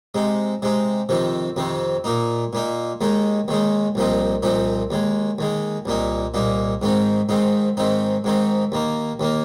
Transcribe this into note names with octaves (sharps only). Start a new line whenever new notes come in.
C3 G#3 D#4
C3 G#3 D#4
F2 C3 D#3 C4
F2 C3 D#3 C4
A#2 A#3 D#4
A#2 A#3 D#4
D#2 D#3 G#3 D#4
D#2 D#3 G#3 D#4
C2 A#2 F3 C4 D#4
C2 A#2 F3 C4 D#4
D#2 D#3 G#3
D#2 D#3 G#3
C2 A#2 A#3 D#4
C2 A#2 A#3 D#4
G#2 D#3 C4 D#4
G#2 D#3 C4 D#4
G#2 D#3 C4 D#4
G#2 D#3 C4 D#4
D#2 D#3 A#3
D#2 D#3 A#3